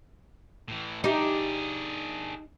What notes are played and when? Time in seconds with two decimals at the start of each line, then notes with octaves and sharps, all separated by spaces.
0.68 A2 E3
1.04 D4 D#4 G4 G#4